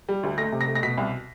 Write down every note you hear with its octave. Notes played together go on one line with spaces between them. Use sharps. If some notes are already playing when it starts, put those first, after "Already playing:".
G3
D2
A3 A#6
C3
A#6
A3
A#6
B2 B6
C2